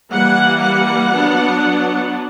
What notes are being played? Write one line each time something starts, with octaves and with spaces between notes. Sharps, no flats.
E3 G3 A#3 F#5
F#5
F#3 B3 D4